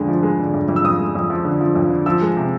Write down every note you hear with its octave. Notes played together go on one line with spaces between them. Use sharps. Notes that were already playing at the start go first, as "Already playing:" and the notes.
Already playing: F2 D3 G#3
F3
G#3
D3
F2
F2
E6
F2 D#6
G#3
F2
F3
D3
F3
F2
D3
F3 E6
G#3
C3